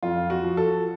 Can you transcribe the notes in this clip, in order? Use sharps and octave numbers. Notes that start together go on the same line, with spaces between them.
F2 F4
F#4
F3
A4